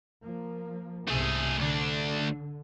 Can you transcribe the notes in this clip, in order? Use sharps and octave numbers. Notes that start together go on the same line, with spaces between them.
F3 A#3
C2 G#2 C3 A3 G#4
D2 D3 D4